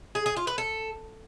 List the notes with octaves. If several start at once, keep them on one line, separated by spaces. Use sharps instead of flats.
G#4
G#4
F4
B4
A4